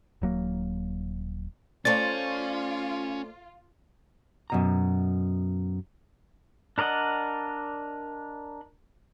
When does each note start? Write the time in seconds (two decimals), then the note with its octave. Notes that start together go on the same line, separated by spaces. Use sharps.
0.22 D#1 F#3 A#3
1.85 A3 C#4 F4 C5 D5 A6
4.50 F#2 B2 A#5
6.78 D4 A#4 D5 D#5 F#5